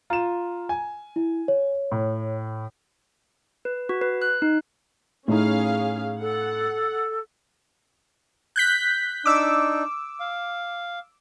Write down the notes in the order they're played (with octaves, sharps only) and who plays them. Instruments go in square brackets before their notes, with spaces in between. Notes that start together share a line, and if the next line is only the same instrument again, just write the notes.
[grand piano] F4 E7 [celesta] A#5
[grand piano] G#5
[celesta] E4
C#5
[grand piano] A2
[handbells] B4
F#4
B4
F#6
D#4
[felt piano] A2 D#4 [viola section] C#4 G#4 F5
[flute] A4 [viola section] F#5
[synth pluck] F#6 G6 B6
[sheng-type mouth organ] D4 D#4 [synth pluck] D6 E6
[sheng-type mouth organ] F5